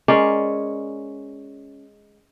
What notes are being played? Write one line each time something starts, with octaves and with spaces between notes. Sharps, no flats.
G#3 C#4 A#4 D5